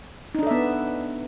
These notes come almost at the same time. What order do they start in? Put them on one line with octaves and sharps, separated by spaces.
D#4 D4 A4 E5 B3